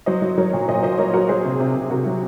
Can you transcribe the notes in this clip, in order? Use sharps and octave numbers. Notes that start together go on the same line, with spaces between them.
F#3 C5 D#5
F#3
F#3 A#4 C#5
A#2
A#2 C5 D#5
A#2 C5 D#5
F#3 A#4 C#5
F#3 F#4 A#4
F#3 G#4 C5
C3
C3
C3
C3 F#4 A#4
F#3